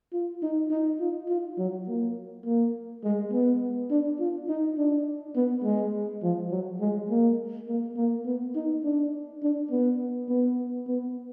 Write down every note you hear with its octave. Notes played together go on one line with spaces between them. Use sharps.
F4
D#4
D#4
F4
F4
F#3
A#3
A#3
G#3
B3
D4
F4
D#4
D4
B3
G#3
F3
F#3
G#3
A#3
A#3
A#3
B3
D#4
D4
D4
B3
B3
B3